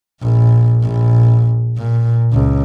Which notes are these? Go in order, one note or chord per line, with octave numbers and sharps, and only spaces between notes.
A#1
A#1
A#2
C#2